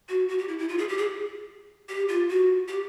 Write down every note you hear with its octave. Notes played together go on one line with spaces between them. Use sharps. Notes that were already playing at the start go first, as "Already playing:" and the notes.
F#4
F#4
G4
E4
E4
F4
G#4
G4
G#4
G4
F4
F#4
G4